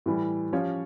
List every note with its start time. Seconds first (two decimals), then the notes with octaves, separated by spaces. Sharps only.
0.06 A2 E3 G3
0.53 F3 C#4 G4 C#5